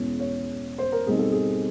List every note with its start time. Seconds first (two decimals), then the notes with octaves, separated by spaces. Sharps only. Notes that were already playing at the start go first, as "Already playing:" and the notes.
Already playing: E2 B2 G#3 C#4
0.20 C#5
0.78 C5
0.92 A#4
1.07 B2 G3 C4 D#4 G#4
1.19 A4
1.32 G#4